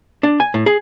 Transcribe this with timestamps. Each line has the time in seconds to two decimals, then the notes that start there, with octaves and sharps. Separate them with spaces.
0.23 D4
0.40 G#5
0.54 A2
0.66 G#4